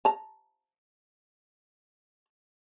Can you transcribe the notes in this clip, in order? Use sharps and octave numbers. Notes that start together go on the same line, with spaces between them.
A5 A#5